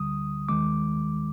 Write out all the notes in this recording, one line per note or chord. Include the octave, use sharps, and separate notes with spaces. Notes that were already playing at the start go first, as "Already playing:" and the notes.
Already playing: D2 D3 G3 D#6
D#2 D#3 G#3 D6